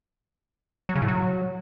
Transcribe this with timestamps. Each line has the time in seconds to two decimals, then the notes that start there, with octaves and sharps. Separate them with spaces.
0.89 F#3
0.95 C#3
1.02 A2
1.08 F#3